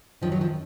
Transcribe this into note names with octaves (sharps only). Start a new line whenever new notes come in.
F#2 D#3 F3
F#3
F3